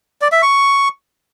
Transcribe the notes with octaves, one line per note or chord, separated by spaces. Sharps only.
D5
E5
C#6